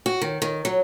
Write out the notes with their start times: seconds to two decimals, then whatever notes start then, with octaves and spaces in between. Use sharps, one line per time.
0.06 F#4
0.21 D#3
0.42 D#3
0.65 F#3